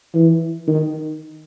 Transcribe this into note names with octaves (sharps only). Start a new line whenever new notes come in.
E3
D#3